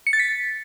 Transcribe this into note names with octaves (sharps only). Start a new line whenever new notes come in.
C#7
A6
B6